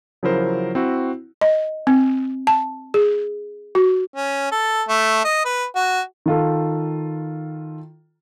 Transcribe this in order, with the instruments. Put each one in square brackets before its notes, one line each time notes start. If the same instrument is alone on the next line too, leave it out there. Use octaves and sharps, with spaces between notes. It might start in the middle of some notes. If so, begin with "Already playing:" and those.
[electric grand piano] C#3 F3 F#3 E4 A#4 C5
C4 E4 F#4
[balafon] D#5
C4
A5
G#4
F#4
[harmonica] C#4
A4
A3
D#5
B4
F#4
[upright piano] D#3 F4 A4